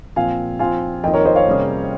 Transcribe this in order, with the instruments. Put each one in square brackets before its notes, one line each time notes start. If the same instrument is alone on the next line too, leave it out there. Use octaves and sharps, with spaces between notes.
[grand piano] A#2 F3 C4 [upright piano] F5 G#5
[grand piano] F3 C4 F4 [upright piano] F5 G#5
[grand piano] F2 D#3 A#3 D#4 [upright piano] D#5 G5
[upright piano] A#4 C#5
C5 D#5
C#5 F5
[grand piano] C3 G3 A#3 C#4 G#4